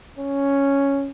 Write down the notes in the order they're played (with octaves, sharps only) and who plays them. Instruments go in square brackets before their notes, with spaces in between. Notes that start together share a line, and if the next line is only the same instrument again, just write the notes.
[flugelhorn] C#4